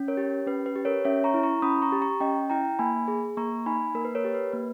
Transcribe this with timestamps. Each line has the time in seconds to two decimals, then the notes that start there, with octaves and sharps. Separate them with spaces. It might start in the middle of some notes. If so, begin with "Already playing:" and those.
Already playing: C#4
0.08 A#4 C#5
0.17 G4
0.46 C#4 B4
0.66 B4
0.76 G4
0.85 A#4 C#5
1.05 C#4 C#5 E5
1.24 A#5 C#6
1.34 E4
1.43 A#5 C#6
1.62 C#4 B5 D#6
1.82 A#5 C#6
1.92 G4
2.02 A#5 C#6
2.20 C#4 D#5 G5
2.50 E4 G5 A#5
2.79 A#3 G#5 B5
3.08 G#4
3.37 A#3 A#5 C#6
3.66 D#4 G#5 B5
3.95 A#3 A#4
4.05 B4
4.15 A#4 C#5
4.24 G4
4.34 B4
4.53 A#3 B4